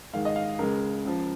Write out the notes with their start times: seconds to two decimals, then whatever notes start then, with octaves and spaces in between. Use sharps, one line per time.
0.13 G#2 D#3 G#3 F5
0.25 D#5
0.36 F5
0.59 C#2 C#3 G#3 A#4
1.05 C#2 C#3 F3